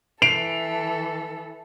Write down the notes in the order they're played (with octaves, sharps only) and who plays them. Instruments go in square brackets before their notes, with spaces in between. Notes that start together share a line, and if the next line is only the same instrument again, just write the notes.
[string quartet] E3 A4 [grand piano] C7 D7 F7